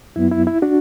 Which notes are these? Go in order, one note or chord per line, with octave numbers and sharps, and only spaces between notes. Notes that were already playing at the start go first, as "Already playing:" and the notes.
F#2 F#3 B3 E4
E4
E4
D4 F#4